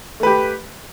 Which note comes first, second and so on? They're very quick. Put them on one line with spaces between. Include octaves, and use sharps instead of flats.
A3 B4 G4